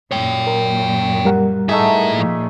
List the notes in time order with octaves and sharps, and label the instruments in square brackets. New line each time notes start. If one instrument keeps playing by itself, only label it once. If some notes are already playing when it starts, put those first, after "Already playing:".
[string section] F#2 A#2 [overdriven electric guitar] C#5 G5
[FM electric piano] A#4
G3 A#4 F#5
[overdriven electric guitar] A2 E5 [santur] A3 D#4 G#4
[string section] A#2 F3